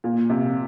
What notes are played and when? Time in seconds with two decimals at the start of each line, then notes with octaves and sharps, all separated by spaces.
0.04 A#2
0.30 C3